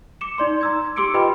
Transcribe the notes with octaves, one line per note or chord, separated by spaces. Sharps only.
D6 C#7 E7
D#4 D5 C6
A#5 E6 G#6
G4 C6 D6 E6 C#7 D7
F4 G4 B4 D#5 G5 B5